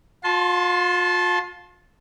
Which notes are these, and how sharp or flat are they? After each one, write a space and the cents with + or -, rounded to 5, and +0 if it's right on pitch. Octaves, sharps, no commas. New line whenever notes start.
F4 +40 A5 -15 C6 +0